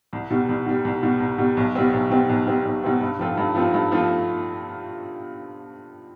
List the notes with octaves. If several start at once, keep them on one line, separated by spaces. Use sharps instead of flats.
C2
B2 G3
C2
B2 G3
C2
B2 G3
C2
B2 G3
B1
B2 G3 C4
B1
B2 G3 C4
B1
B2 G3 C4
B1
B2 G3 C4
G2
F3 A3 C4 F4
G2
F3 A3 C4 F4
G2
F3 A3 C4 F4